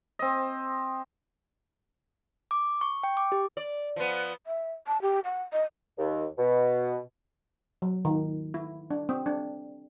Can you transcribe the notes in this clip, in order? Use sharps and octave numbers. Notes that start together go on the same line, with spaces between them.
C4 D#5
D6
C#6
G5
D6
G4
D5
F3 B3
E5
A5
G4
F#5
D#5
D#2
B2
F#3
D#3
E4
D4
C4
D4